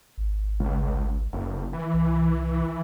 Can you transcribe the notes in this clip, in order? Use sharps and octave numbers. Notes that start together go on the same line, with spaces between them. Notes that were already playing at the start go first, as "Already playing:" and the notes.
G#1
C#2
F#1
E3
C2